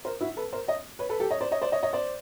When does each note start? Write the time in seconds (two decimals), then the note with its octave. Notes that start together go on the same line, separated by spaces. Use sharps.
0.05 A#4 C5
0.21 E4 F#4
0.37 A4 B4
0.52 A#4 C5
0.68 C#5 D#5
0.99 B4 C#5
1.10 A4 B4
1.20 G4 A4
1.31 C#5 D#5
1.41 C5 D5
1.51 C#5 D#5
1.62 C5 D5
1.72 C#5 D#5
1.83 C#5 D#5
1.93 C5 D5